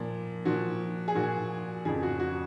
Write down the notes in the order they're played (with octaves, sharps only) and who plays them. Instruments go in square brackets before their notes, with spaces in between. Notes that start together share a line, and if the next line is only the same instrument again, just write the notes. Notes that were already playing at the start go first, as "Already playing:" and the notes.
Already playing: [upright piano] A#2 F3
A#2 F3 F#4
G#4
A#2 F3 F#4
F2 C#3 F3 G#4
F#4
F#4